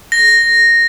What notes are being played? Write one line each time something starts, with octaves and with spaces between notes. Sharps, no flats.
A#6